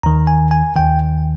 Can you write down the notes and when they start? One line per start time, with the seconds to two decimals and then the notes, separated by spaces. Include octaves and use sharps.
0.03 D#2 D#3 A#5
0.27 G#5
0.51 G#5
0.76 D#2 D#3 G5